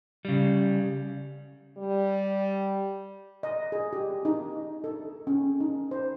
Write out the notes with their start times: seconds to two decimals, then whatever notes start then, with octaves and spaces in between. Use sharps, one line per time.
0.25 C#3 G3
1.78 G3
3.43 D#5
3.72 G#4
3.93 G4
4.25 D#4
4.84 A4
5.27 C#4
5.60 D#4
5.91 C5